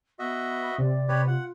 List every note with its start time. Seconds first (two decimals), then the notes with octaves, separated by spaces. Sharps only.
0.19 B3 F#4 D#5 E5
0.78 C3 D5
1.09 C3 G4 B4 C#5
1.28 F4 F#5